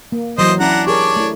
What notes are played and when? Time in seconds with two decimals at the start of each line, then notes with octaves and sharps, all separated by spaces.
0.12 A#3
0.38 E3 F#3 C5 D#5
0.60 C#4 D4 E4 F#5 A#5
0.87 D4 G4 G#4 A#4 C#5 D5
1.16 A3 E4